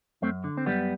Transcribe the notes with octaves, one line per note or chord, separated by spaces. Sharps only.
F#2 A3 C4
D3
C4
F#2 G3 B3